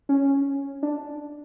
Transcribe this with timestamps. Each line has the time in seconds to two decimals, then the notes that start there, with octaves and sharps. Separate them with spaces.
0.09 C#4
0.83 D4